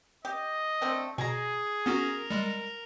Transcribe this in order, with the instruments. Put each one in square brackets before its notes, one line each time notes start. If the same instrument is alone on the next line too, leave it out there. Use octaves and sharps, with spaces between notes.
[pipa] G4 [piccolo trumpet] D#5
[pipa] A3 C4 D4
[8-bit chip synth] B2 [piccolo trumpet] G#4 [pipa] G#5 A#5
[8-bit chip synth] B3 C#4 F#4 [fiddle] A#4
[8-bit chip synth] G3 G#3